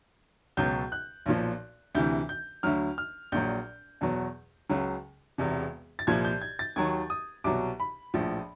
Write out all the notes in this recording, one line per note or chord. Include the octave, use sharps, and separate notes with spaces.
C#2 B2 F#3 G6
F#6
B1 A#2 F3
D2 C3 E3 G6
G6
D2 D3 F#3 F6
F6
A#1 A#2 F#3 G6
E2 B2 F#3
C#2 C#3 F#3
E1 E2 C3
A6
C2 A#2 F3 G#6
G6
G#6
A6
D#2 D#3 F#3 G#6
D#6
C2 B2 F#3 D6
B5
A#1 A2 F3